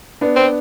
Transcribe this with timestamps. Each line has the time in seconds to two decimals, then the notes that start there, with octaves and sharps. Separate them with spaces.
0.21 B3 D4
0.36 C4